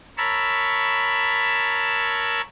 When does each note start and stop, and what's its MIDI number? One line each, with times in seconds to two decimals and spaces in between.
0.17 2.41 70
0.17 2.41 73
0.17 2.41 81
0.17 2.41 83
0.17 2.41 85
0.17 2.41 88